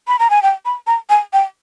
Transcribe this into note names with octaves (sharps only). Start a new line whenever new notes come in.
B5
A#5
G#5
G5
B5
A#5
G#5
G5